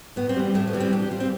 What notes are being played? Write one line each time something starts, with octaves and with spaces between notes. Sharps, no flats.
A2 B3
C4
E3 G3
A2 A3
B3
E3 G3
C4
B2 D4
G4
G3 F4
C4